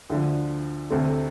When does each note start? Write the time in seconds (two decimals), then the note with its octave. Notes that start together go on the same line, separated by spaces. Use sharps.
0.10 D2 D3 F3
0.90 D2 C3 A3 C4 A4